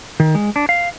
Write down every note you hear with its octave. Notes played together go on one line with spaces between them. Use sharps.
D#3
G#3
D4
F5